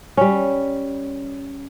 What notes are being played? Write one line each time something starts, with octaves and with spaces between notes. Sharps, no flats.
G3 C#4